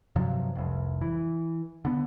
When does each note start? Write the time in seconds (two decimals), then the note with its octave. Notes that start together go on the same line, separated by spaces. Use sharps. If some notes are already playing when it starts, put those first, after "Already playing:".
0.16 G2 C3 F3 F#3
0.55 F1 C2
1.01 E3
1.85 D3 B3